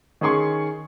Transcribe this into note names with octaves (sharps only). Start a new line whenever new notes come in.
D#3 C#4 G#4 C6 C#6